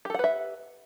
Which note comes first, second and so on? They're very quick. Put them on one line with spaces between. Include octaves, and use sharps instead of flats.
G4 A4 F#5 B4 E5